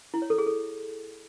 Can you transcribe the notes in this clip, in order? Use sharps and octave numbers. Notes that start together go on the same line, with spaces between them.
E4
C#5
A4
G#4
A4